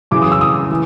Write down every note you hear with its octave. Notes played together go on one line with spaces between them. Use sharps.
F#2 C#3 E3 D6
D#6
E6
D#6
E3